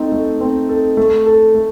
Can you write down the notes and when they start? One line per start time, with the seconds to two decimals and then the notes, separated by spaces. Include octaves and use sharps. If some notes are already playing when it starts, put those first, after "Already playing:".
Already playing: A3 C4 D#4 A4
0.12 A3
0.41 C4
0.69 A4
0.97 A3
1.26 A4
1.54 A3